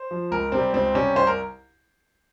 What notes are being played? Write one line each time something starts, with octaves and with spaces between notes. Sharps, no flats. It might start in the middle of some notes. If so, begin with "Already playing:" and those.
Already playing: C5
F3
C#2 A#4
C3 G3 C4
C#2 C4
C3 G3 C#4
C2 C5
A#4